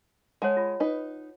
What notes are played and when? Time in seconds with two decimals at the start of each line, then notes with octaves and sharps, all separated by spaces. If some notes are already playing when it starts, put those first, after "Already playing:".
0.42 G#3 C#5 F#5 A5
0.57 F4
0.80 D#4 B4